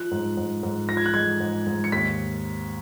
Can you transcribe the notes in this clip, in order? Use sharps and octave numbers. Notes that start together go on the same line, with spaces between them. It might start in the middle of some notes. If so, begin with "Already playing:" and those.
Already playing: F3 F#6
G#2
G#2
G#2
F3 A#6
G#6
F#6
G#3 G#6
G#2
G#2
C#7
D#2 B6